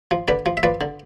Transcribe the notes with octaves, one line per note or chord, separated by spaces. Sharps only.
F3
D3 B4 D5
F3
E5
F3 B4 D5
D3